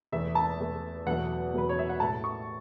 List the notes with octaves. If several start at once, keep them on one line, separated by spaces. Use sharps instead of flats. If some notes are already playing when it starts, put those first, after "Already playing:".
E2 E3 A3 E5
A5
E2 E3 A3
E2 B2 F#3 A3 F#5
E2 B2 F#3 A3 B4
C#5
E5
F#5
A2 A3 A5
C#6